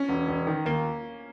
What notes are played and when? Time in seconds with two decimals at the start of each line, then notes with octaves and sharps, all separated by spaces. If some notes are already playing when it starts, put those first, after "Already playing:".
Already playing: C#4
0.09 E1
0.28 E1
0.47 D#3
0.65 D#2 A#3